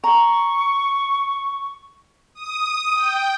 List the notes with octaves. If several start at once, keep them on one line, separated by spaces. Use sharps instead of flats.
A#5 C#6
D#6
G5